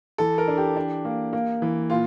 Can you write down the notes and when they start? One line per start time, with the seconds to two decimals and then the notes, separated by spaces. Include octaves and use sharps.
0.18 E3 A4
0.38 A#4
0.48 D4
0.58 G4
0.76 D4
1.05 A#3
1.33 A#3
1.62 E3
1.90 A#2 F4